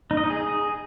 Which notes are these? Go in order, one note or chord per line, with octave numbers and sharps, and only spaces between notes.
D#4
D#5
D#4
G#4